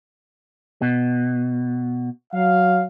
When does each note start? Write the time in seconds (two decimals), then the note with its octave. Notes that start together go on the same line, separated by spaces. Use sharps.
0.82 B2
2.33 F#3 F5